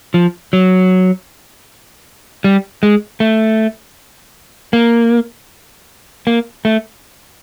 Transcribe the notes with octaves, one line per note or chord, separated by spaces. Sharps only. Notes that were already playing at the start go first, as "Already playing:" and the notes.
F3
F#3
G3
G#3
A3
A#3
A#3
A3